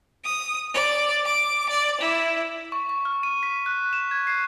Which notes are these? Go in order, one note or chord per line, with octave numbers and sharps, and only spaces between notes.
D#6
D5
D6
D5
E4
C#6
C#6
F6
D#7
B6
F#6
E7
G#6
C7